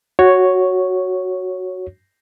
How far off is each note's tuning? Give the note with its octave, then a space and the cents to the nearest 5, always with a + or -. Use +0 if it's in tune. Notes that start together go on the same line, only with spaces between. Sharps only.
F#4 +0 C#5 +0